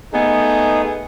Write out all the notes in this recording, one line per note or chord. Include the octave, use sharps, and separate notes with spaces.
A3 B3 D#4 G#4